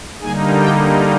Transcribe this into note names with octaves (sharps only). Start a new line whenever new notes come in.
D3 G3 A#3 D#4 G#4 G#5
G4 G5